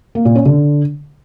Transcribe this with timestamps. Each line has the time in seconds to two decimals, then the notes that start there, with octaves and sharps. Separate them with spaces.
0.15 A#3
0.25 A#2
0.35 C#4
0.46 D3